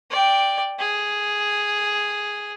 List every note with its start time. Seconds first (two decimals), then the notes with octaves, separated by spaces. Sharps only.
0.10 D5 G5
0.79 G#4